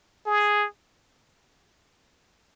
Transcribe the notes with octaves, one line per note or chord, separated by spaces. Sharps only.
G#4